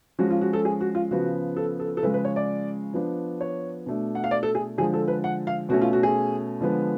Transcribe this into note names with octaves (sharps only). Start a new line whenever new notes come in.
F3 G#3 C#4 F#4
F4
F#4
A4
G#4
F#4
F4
C#3 F3 B3 F#4
A4
A4
A4
C#3 F3 G#3 B4
B4
C#5
D5
F3 B3 D4
C#5
B2 A3 D4
F#5
F5
D5
A4
G#4
D3 F3 G#3 G#4
A4
B4
F#5
F5
B2 A3 C#4 F#4
F4
F#4
G#4
D3 F3 G#3 B3